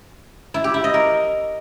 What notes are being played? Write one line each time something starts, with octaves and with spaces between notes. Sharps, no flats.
E4
G4
E4
D#5
A#4